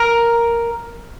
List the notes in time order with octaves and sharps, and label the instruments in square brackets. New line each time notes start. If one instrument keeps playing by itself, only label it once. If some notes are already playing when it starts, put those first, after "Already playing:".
Already playing: [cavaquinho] A#4